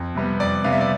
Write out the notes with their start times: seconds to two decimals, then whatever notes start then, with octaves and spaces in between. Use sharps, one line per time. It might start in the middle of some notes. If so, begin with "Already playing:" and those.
Already playing: F2
0.15 C3 G3 B3
0.40 F2 D5
0.64 C3 G3 B3 F5
0.72 E5
0.81 D5